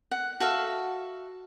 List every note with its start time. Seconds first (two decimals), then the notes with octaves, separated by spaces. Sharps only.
0.11 F#5
0.40 F#4 A4 E5 F5